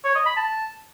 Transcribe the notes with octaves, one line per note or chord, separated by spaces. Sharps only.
C#5
D#5
B5
A5